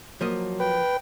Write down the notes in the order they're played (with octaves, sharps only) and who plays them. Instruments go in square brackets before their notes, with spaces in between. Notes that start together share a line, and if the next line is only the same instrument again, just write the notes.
[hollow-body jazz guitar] F3 A#3 D#5 [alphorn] F#3
[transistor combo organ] B4 [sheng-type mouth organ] G5